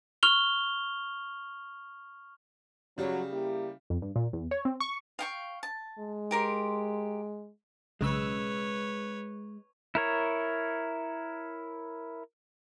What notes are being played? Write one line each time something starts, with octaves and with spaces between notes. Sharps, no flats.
C#6 F6 F7 G7
C#3 F#3 G3
A#3 E4 G4
F2
G2
A#2
E2
C#5
C4
C#6
F5 G5 C#6
A5
G#3
G4 A#4 C6
B1 C#3 G#3 B4 C#5 E6
E4 A#4 C#5